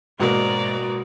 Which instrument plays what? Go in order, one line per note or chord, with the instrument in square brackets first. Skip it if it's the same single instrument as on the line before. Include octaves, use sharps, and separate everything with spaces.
[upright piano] A1 B2 A#3 [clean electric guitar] G#2 [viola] F#4 [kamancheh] D5 A#5